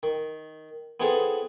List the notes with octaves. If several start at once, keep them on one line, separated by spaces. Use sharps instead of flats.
D#3
B3 C4 E4 G#4 A4 B4